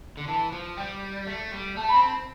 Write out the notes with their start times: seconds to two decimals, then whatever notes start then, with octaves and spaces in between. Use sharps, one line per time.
0.17 D3
0.28 E3 A5
0.52 F3
0.77 G3 G5
1.27 A3
1.52 G3
1.77 A3 A5
1.89 C4 B5
2.01 A5